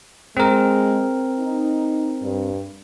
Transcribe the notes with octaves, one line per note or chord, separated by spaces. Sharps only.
G#3 C4 A#4
D#4
G2